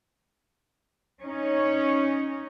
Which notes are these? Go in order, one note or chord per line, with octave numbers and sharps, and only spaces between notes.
C#4 D#4 C#5